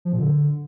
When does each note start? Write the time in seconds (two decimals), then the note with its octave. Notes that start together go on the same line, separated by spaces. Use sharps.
0.05 F3
0.12 A#2
0.20 D3